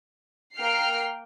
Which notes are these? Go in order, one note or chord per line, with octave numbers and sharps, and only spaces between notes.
A#3 G5 F6 C7